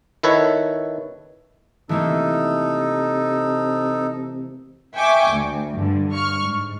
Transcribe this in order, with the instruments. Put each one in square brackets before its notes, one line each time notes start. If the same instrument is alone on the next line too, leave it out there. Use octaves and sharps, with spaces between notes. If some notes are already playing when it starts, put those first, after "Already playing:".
[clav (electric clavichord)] D#3 E4 A4 B4 C#5
[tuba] C3 [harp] E3 A3 A#3 [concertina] D#4 A4
[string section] E5 G5 G#5 C#6 D6
D2
G2 D3
C#6 F6
G#2